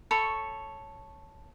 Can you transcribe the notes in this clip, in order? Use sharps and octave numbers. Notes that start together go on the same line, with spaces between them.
A4 C#5 B5 C#6